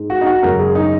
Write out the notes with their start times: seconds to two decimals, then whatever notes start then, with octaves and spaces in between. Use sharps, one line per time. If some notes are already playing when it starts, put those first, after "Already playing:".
Already playing: G#2 G#3
0.10 F#4
0.21 D#4
0.27 F#4
0.43 F#2 C#3 G#3 A#4
0.59 G#4
0.75 D#4